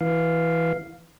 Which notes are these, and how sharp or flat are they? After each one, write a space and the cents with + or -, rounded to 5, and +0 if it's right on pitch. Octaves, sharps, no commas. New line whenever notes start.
E3 +0 F5 +0